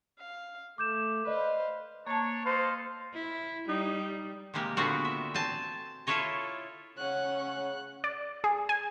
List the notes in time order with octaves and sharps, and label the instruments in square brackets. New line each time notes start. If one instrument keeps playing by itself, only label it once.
[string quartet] F5
[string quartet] A3 [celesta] D6 G6 E7
[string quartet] B4 C5 F5 [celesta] D5 D#5
[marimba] A#3 A5 [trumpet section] D4 C#5
[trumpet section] A4 D#5 F5 [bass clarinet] C5
[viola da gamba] E4
[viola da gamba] G3 [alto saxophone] D#4
[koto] C3 G3 G#3 A#3 G4
A#2 D3 B3 C4 F#4 A#4
E5
C4 G#5 A5
E4 F4 A4 C#5 D#5
[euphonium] C#3 [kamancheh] C#4 F#5 [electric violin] F#6
[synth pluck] D5
G#4
G#5